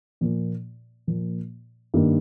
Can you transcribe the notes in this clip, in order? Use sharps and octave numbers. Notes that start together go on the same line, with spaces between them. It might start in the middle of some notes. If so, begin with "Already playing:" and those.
A#2 F3 A#3
A#2 F3 A#3
G2 D#3 G3 A#3